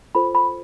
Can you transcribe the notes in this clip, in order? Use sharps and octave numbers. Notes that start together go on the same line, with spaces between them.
F4 A4 C5 B5
B5